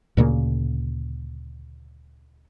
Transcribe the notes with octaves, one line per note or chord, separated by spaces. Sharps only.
D2 A#2 C#3 A#3